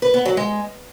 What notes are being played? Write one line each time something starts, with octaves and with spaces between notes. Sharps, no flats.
B4
B3
F#3
G#3